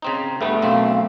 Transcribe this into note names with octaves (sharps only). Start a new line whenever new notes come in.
C#3 C4 D#4
G2 G3 A3 B3
B1 F#2 C4 F5